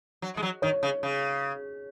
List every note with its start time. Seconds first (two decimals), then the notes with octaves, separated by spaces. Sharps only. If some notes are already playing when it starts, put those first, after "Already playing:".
0.22 F#3
0.37 G#3
0.43 F#3
0.62 D#3 C#5
0.83 C#3
1.03 C#3